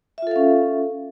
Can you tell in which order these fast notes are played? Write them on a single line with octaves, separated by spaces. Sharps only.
E5 F4 A4 F5 C#4